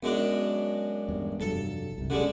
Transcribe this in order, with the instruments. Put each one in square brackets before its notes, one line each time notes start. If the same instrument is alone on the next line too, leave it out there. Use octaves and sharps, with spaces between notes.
[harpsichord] F#2 G#3 D4 [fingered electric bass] B3
[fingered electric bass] E2 G2
[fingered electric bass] F1 G2 F#3 [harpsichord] A4
[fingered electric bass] C2 C3
[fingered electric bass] E1 B1 C#4 [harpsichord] D3 G3 G#3